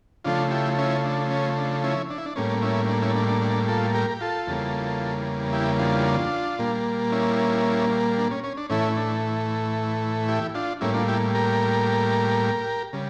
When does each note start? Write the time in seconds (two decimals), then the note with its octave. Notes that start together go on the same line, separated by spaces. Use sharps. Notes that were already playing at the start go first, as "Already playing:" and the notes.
0.25 C#3 F3 A3 D4 F4
0.51 E4 G4
0.78 C#4 E4
1.05 D4
1.30 C#4
1.58 D4
1.84 C#4 E4
2.10 D4
2.18 E4
2.26 D4
2.36 A2 G3 A#3 C#4
2.62 C#4 E4
2.89 D4
3.02 C#4 E4
3.16 D4
3.28 D4
3.41 D4
3.68 F4 A4
3.94 G4 A#4
4.11 G4
4.21 F4 A4
4.47 E2 C#3 G3 A#3
5.53 E4 G4
5.79 D4 F4
6.59 A#2 G3 A#3
7.12 C#4 E4
8.18 D4
8.31 C#4
8.44 C#4
8.57 D4
8.70 A2 E3 A3 C#4 E4
8.97 D4
10.29 E4 G4
10.55 D4 F4
10.81 A2 G3 A#3 C#4 E4
10.94 D4 F4
11.08 E4 G4
11.35 G4 A#4
12.93 C#3 G3